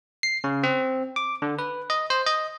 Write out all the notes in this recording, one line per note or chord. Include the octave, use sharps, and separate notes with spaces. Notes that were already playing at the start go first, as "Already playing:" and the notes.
C7
C#3
C4
D6
D3
B4
D#5
C5
D#5